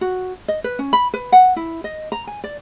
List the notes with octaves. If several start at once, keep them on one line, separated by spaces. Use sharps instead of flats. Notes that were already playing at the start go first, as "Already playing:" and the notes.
F#4
D#5
B4
C#4
B5
B4
F#5
E4
D#5
A#5
G#5
D5